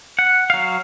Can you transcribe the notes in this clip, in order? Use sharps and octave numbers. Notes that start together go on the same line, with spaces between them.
F#5
F#3 F5